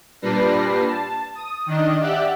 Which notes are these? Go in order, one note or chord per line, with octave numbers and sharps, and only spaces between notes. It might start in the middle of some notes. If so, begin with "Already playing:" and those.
A#2 G3 D4 B4 A#6 C7
A5
D#6
D#3 D4 D#5
G4 D5 E5 F#5 F#6